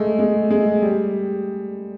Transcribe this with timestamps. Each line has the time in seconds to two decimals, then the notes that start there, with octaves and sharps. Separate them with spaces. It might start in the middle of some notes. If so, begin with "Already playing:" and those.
Already playing: G#3 A3
0.19 G#3
0.50 G#3
0.82 G3